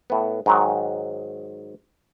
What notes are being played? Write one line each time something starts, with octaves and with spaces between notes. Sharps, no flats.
A2 B3
G#2 D#3 F#3